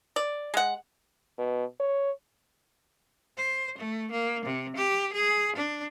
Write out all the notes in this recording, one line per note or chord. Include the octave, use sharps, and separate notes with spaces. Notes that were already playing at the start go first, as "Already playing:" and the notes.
D5
G#3 F#5
B2
C#5
C5
A3
A#3
C3
G4
G#4
D4